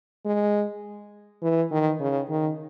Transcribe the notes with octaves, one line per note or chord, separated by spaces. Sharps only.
G#3
E3
D#3
C#3
D#3